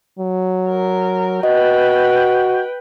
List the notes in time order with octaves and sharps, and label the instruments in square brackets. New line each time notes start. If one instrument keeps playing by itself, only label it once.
[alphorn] F#3
[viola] A#4
[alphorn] F#4 [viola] B4 G5 [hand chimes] D#5